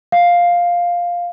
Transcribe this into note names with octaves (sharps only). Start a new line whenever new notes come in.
F5